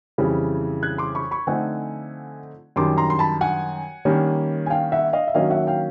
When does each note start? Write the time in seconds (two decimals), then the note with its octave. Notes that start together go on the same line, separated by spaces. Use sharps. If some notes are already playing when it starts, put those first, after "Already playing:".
0.18 F2 C#3 E3 G3
0.83 F#6 G#6
0.98 C6 D6
1.15 B5 C#6
1.31 B5 C#6
1.47 D3 F3 A3 C4 D#4 F#5 G#5
2.76 F#2 D#3 G3 C6 D6
2.97 A#5 C6
3.10 C6
3.19 A5 B5
3.41 F#5 G#5
4.05 D#3 G3 A#3 C#4
4.66 G#5
4.70 F5 G5
4.92 E5 F#5
5.13 D#5 F5
5.28 E5
5.34 D#3 F#3 A#3 C#4 D#5 F5
5.51 E5 F#5
5.67 F5 G5